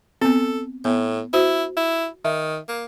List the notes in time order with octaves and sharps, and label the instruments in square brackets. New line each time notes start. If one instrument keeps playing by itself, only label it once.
[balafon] B3 C4 [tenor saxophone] A4
[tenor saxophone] A2 [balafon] B3
[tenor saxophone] E4 [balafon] F#4 C5
[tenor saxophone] E4
[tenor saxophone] D#3 [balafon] E5
[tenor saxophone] A#3